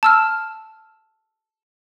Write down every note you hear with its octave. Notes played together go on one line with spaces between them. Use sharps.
A5 E6 F6